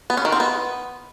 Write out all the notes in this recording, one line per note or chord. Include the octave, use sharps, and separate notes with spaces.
B3
C#4
D#3
C4
B3